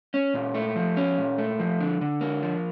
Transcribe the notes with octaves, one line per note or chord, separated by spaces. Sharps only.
C#4
A#2
A3
F3
C#4
A#2
A3
F3
D3
D3
A#3
F3